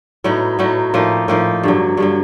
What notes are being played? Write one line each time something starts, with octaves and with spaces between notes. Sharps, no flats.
A2 F#3 B3 D#4
A2 F#3 B3 D#4
A2 F3 A#3 D#4
A2 F3 A#3 D#4
G2 D3 F#3
G2 D3 F#3